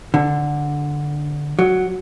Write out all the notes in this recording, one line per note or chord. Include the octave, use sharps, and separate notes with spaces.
D3
F#3